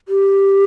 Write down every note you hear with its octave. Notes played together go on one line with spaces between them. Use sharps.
G4